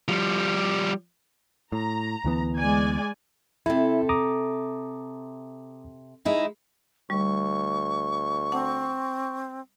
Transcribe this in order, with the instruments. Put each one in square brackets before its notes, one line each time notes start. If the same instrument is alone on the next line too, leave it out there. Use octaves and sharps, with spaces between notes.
[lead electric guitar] F3 G3
[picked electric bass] A2 [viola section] A#5
[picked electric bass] D2 E3 B3
[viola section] G#3 D5 G#5
[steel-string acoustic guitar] C3 A4 [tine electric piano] E4
[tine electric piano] A#5 D6 D#6
[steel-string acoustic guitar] G#3 D#4 E4
[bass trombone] D2 [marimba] G3 [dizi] C#6
[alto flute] C4 [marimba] F#5 A5 D6